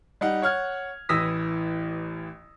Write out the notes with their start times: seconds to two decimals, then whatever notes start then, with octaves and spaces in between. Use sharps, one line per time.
0.21 G3 D#4 F#5
0.42 C#5 F#5 F6 G#6
1.09 A1 E3 D#6 E6 A#6 B6